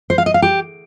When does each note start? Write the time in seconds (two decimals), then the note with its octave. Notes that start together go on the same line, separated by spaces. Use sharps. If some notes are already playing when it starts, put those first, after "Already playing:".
0.10 C5
0.18 F5
0.26 D#5
0.34 F5
0.42 G4